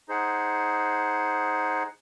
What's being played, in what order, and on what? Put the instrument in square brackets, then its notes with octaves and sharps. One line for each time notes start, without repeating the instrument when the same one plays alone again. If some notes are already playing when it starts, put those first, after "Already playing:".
[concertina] D#4 G#4 C5 F#5